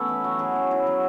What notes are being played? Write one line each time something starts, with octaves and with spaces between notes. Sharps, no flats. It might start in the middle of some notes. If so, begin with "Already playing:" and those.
Already playing: E3 A3 B3 C#4 A4 B4
E4
F#3 F#4
F#3 G#4
C#4
E4
F#3